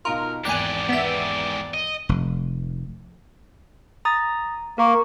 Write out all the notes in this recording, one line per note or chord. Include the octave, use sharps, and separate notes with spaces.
B2 D#4 F4 A#4 A#5
G#1 E2 G#2 G4 D5 G#5 F#6
B3 E5
D#5
F1
A#5 D#6 A6
A#3 A#4 C#6